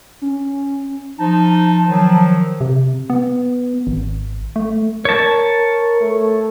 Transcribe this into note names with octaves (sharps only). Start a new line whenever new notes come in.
C#4
F3 D#4 A5
D#3 F3 F#3
C3
B3
G#1
A3
A#4 C#5 A5
A3